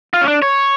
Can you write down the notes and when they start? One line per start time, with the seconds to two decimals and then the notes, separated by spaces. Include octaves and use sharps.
0.14 F4
0.21 C#4
0.28 D4
0.42 C#5